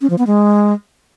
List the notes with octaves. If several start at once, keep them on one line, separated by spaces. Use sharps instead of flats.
C#4
F3
B3
G#3